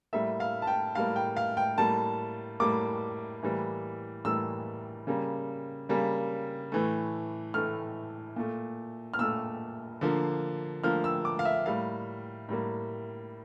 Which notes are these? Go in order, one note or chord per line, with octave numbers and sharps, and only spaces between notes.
A2 G3 A#3 E5
F5
A5
G5
A2 G3 A#3 F5
G5
F5
G5
A2 G3 A#3 A5
A2 G3 A#3 D6
A2 E3 G3 A#3
A2 E3 G3 A#3 E6
C#3 G3 A#3
C#3 G3 A#3
A2 E3 A3
A2 E3 A3 F6
A#2 A3
F6
A#2 A3 E6
D3 F3 A#3
D3 F3 A#3 F6
E6
D6
F5
E5
A2 G3 A#3 F5
A2 G3 A#3